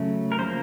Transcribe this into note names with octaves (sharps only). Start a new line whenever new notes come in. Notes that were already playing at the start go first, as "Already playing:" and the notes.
Already playing: C#3 F#3 A3
A#4
C#3 F3 A#3 C5